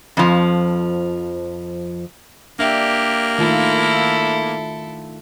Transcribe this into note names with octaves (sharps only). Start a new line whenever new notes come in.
F2 F3
A#3 D4 G4 E5
D#3 A3 E4 F4 A4